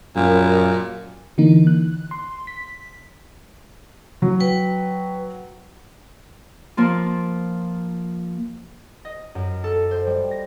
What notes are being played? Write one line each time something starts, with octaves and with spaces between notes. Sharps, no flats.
F#2 A#2
D3 E3 A#3 D#4
F#6
C6
B6
F#3
B4 G5
F3 A#3 F4
D#5
F#2
A4
C5
G3
A#6